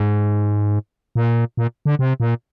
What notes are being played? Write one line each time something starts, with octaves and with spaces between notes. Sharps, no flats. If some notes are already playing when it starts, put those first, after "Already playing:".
Already playing: G#2
A#2
A#2
D3
C3
A#2